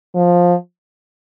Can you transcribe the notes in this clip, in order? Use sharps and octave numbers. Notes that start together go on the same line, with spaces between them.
F3